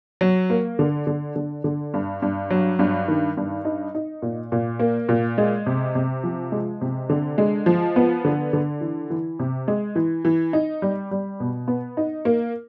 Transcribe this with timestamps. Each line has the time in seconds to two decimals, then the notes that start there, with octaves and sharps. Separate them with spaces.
0.21 F#3
0.50 A#3
0.79 D3
1.07 D3
1.36 D3
1.64 D3
1.94 G2
2.22 G2
2.50 F#3
2.79 G2
3.08 D#3
3.37 G2
3.65 D#4
3.95 D#4
4.22 A#2
4.52 A#2
4.79 A#3
5.09 A#2
5.38 G#3
5.66 C3
5.95 C3
6.24 F3
6.52 G#3
6.81 C3
7.09 D3
7.38 G#3
7.66 F3
7.96 B3
8.25 D3
8.53 D3
8.81 E3
9.10 E3
9.39 C3
9.68 G#3
9.96 E3
10.25 E3
10.53 D#4
10.82 G3
11.11 G3
11.40 B2
11.68 B3
11.97 D#4
12.25 A#3